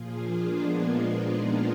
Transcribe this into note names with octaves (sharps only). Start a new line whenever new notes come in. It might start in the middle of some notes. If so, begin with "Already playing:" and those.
Already playing: A#2 F3 F4 G#4
A#3 D4
G#3 B3
A#3 D4
B3 D#4